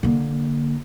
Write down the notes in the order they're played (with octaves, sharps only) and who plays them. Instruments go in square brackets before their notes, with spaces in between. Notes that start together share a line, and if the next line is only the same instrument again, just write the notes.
[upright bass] D3 A#3